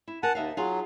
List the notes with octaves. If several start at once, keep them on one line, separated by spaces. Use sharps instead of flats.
E4
A#4 F#5 G#5 A5
D#2 D#4 E5 F5
F#3 F4 G#4 F5